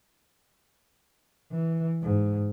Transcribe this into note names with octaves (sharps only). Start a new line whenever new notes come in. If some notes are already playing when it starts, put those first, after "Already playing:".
E3
G#2